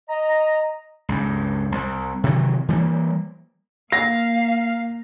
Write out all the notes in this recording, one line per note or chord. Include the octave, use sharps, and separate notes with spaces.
D#5 A#5
C#2 G2
C2
C3 D#3 E3 F#3
E3 G3 A3 A#3
A#3 F5 A#6